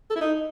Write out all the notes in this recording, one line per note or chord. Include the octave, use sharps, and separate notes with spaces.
A4
E4
D#4